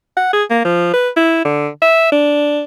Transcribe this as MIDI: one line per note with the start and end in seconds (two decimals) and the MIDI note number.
0.17 0.31 78
0.33 0.43 68
0.50 0.61 58
0.65 0.92 53
0.93 1.09 71
1.17 1.41 64
1.45 1.68 50
1.82 2.11 76
2.12 2.64 62